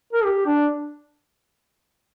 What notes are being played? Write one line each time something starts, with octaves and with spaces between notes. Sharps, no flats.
A#4
G4
D4